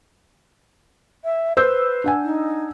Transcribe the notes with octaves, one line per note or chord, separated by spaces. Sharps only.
E5
B4 C5 E6 G6
D4 F#5 G#5
D#4